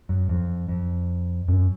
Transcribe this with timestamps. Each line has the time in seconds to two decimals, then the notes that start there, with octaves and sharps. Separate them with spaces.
0.09 F#2
0.29 F2
0.68 F2
1.48 F#2